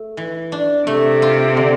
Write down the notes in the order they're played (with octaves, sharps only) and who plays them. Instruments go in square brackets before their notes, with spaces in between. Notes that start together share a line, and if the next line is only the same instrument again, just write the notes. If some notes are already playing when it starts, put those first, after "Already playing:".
Already playing: [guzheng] A3
E3
D4
[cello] C3 [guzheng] A3
[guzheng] F4
D3